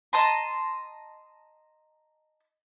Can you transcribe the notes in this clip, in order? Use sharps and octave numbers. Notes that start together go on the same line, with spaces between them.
D#5 A5 A#5 C6